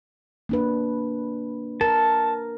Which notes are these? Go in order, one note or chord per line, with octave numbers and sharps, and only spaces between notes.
A#3 D4 B4
A#4 A5